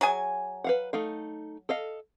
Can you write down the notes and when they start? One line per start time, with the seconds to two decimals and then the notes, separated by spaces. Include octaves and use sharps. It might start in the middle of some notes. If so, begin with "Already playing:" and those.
0.01 F#3 G#4 G#5
0.64 B4 F5 F#5
0.93 A3 D#4 F5
1.69 A4 D#5 F5